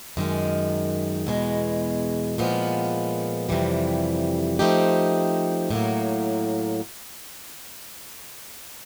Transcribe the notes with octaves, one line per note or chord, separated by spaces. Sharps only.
F#2 D#3 G#3
E2 B2 G#3
A#2 F3 G#3 B3
F2 C3 E3 G3
F3 A3 C4 D#4 G4
A2 F#3 A#3